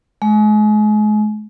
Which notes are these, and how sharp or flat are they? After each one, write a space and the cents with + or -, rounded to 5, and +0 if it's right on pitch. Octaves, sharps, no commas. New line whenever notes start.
G#3 +35